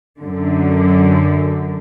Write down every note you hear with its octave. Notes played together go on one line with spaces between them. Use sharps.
F#2 D3